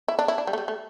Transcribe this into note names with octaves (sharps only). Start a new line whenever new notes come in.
E4
D4
E4
D4
G3
A3
G3
A3